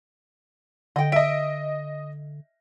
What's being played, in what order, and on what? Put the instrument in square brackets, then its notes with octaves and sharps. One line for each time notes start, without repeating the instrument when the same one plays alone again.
[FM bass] D3 [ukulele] D#5 G5
[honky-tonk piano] D#5 D7 [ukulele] E5